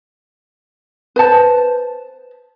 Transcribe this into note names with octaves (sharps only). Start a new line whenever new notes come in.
B4 C5 A5